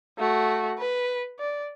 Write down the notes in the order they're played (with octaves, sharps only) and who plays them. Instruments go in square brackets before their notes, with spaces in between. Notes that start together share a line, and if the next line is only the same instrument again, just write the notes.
[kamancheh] A3 F#4
B4
D5